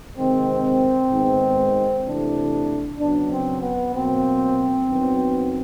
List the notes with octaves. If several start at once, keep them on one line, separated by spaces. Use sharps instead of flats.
C3 D#3 G#3 C4
G#2 D#3 G#3 B3
C3 E3 A3 D4
C#3 F#3 B3 D4
C4
B3
B2 F#3 A#3 C4
F#2 D#3 F#3 B3